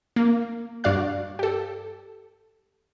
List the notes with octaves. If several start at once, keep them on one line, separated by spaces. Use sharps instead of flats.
A#3
G2 F#4 D5 F5 F#6
G4 A4